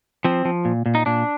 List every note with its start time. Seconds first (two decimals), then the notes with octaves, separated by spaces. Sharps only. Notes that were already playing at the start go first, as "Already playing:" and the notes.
0.25 F3 C4
0.45 F3
0.65 A#2
0.86 A#2
0.95 D#4
1.06 A#2 D4